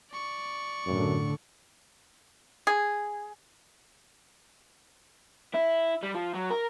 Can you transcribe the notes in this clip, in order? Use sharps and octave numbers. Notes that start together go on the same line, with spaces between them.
D5 C#6
F#2 A2 D3
G#4
E4
G3
F3
F#3
A#4